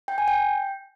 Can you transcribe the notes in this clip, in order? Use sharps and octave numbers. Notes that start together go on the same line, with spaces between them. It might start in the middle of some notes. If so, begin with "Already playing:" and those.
G5
G#5
G5